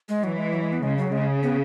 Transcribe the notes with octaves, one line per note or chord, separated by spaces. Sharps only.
G#3
E3 F#3
G#3
F#3
G#3
B3
C#3 G#3
F#3
C#3 G#3
B3